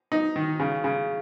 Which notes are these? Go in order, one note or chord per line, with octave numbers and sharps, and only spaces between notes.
D#4
D#3
C#3
C#3